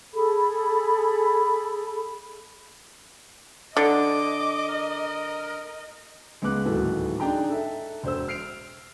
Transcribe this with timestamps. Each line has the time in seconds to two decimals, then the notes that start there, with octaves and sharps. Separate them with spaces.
0.14 G#4 A4 B5
3.77 D3 D#5 D6
4.69 A#4
6.42 C#2 G#3 B3 D6 F#6
6.65 D1 D#2 G#2 E3 F#4 A4
7.20 D4 D#4 G#4 G5 A#5
7.49 A4 E5
8.03 E1 C5 E6
8.28 F6 C7 D7 F7